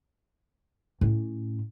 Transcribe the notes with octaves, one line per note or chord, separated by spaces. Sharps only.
A2 C#4